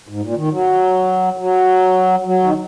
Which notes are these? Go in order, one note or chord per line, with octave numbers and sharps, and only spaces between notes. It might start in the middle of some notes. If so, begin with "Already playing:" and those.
G#2
A#2
D#3
F#3
F#3
F#3
D#3